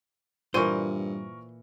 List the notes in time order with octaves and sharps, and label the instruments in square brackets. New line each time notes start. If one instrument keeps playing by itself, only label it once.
[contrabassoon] G2 [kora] A#2 E3 [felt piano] A#4 C#6 D#7 [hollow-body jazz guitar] C5